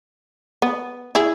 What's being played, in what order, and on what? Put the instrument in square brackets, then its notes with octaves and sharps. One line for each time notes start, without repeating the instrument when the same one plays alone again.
[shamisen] B3
E4 G#4